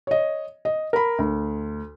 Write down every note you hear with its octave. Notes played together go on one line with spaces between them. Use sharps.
C#5 D#5
D#5
A#4 B5
D2